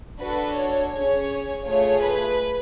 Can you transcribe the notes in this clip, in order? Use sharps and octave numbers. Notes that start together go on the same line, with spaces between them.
D4 F#4 A4 B4
C#5
C#4 G#4 C#5
A3 F4 G#4 C#5
B4